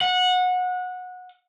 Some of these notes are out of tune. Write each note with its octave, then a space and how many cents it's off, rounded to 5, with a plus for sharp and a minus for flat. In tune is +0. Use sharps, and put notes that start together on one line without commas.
F#5 -20